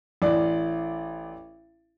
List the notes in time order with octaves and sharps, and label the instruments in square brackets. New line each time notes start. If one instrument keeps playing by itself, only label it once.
[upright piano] A1 D5